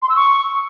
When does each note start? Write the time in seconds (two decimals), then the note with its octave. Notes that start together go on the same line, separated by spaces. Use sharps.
0.02 C6
0.09 E6
0.16 C#6